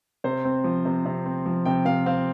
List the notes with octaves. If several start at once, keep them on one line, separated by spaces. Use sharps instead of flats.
C3 C5
C4
F3
C3
C3
C4
F3
C3 G5
C3 F5
C4 F5